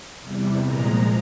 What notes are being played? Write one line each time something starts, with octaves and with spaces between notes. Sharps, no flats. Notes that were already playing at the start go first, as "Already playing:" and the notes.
E2 C3 E3 G3
A#2 F3 G#3 A#5